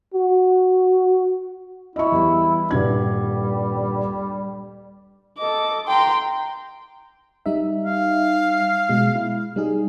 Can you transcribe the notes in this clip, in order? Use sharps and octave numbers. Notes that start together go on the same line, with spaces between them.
F#4
E4 D#5 C#6
E2 G3
D#1 G2 G3 G#6
A4 D#5 D6
G5 A#5 C6
G3 D#4 E5
F5
B2 G#3
E4
G3 D#4 G#4